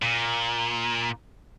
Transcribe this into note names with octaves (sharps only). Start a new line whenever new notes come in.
A#2